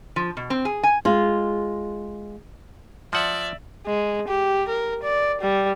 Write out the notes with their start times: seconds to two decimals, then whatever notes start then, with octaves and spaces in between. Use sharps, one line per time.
0.16 F3
0.37 B2
0.50 C4
0.65 G#4
0.83 G#5
1.05 G#3 F4
3.13 F3 D5 E5 F#5
3.87 G#3
4.28 G4
4.68 A#4
5.03 D5
5.41 G3